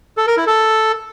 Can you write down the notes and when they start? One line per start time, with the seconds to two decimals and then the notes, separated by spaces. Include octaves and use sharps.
0.17 A4
0.27 A#4
0.37 E4
0.47 A4